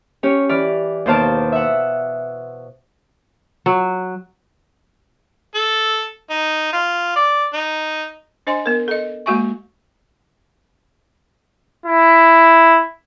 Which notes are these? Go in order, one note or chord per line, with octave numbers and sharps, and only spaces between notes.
C#4 G4 C#5
E3 D5 B5 F6
D#2 B2 C5 F5 A5 D6
E5 F#5
F#3
A4
D#4
F4
D5
D#4
D4 C5 D#5 G#5 C6
B3 A#4
A4 D#5
G#3 A#3 F#4 E5 G#5 C#6
E4